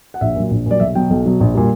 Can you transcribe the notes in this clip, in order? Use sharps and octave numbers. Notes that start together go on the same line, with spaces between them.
F#5
A#1 E5
A#2 F#3
A#1
A#2 F#3 D5
B1 E5
B2 F#3 G5
B1
B2 F#3
A#1
A#2 G3